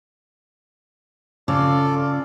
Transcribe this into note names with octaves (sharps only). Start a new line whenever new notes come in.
C#3 F4 A4 D5